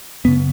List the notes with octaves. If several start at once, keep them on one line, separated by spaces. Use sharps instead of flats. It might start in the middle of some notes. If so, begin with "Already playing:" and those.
F#2 C#3 B3